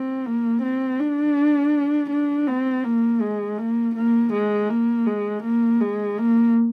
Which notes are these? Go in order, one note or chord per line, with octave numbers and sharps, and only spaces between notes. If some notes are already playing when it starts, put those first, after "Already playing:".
Already playing: C4
A#3
C4
D4
D4
C4
A#3
G#3
A#3
A#3
G#3
A#3
G#3
A#3
G#3
A#3